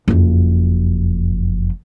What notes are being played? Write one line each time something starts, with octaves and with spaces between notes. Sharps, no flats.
F#1 F2